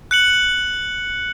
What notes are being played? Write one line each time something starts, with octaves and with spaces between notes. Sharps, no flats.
F#6 C#7 F#7